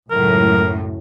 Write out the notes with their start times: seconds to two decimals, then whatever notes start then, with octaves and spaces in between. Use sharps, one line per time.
0.11 C#2 F#2 A2 A#4